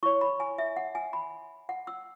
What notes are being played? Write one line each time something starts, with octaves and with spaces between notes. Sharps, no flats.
E4 C#5 C#6
B5
G#5
E5
F#5
G#5
B5
F#5
E6